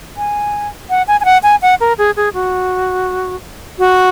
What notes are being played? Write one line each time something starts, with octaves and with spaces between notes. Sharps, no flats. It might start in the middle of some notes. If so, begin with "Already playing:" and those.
G#5
F#5
G#5
G#5
F#5
G#5
F#5
A#4
G#4
G#4
F#4
F#4